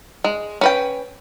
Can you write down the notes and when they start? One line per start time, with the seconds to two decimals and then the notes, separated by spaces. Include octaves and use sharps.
0.24 G#3
0.61 C#4 B4 G5